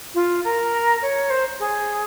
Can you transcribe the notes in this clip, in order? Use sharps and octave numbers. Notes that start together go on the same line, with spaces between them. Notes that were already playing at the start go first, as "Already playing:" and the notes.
F4
A#4
C#5
C5
G#4